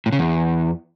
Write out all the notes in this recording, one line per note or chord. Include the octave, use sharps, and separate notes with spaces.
A2
C#3
E2